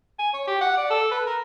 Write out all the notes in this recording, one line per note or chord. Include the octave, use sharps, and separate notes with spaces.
G#5
C#5
G4
F#5
D5
A4
B4
A#4